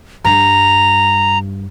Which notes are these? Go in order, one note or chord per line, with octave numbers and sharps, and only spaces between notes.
G2 A#5